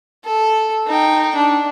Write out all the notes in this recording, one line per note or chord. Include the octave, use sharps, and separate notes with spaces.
A4
D#4 G5
D4